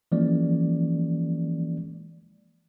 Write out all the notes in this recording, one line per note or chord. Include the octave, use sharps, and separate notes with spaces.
E3 F3 G#3 A#3 C#4 D5